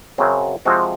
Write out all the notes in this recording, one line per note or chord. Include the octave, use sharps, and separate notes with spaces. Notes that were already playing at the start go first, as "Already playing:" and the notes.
F#2 C#3 F#3 C4
C3 F3 G#3 C4 F#4